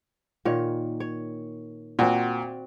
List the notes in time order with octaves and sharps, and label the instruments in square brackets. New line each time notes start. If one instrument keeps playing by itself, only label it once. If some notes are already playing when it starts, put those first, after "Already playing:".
[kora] A#2 D#3 C#5
C#5
[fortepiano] A#2 [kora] C4 F#4